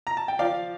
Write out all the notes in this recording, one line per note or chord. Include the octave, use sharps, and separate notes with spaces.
A#5
A5
G5
F3 D5 F5